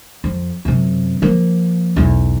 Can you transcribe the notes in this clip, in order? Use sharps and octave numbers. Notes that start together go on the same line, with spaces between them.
F2
F#2 C3
F3 A#3
B1 E2